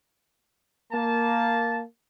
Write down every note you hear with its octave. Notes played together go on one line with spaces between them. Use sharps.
A#3 A5